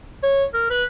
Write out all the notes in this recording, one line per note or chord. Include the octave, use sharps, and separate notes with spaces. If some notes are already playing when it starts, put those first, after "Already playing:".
C#5
A#4
B4